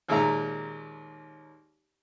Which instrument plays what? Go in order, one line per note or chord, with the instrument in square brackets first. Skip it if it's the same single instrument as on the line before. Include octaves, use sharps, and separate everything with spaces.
[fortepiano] D#2 A#2 G#3 E5 A#5